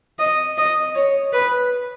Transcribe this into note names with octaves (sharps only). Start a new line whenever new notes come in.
D#5
D#5
C#5
B4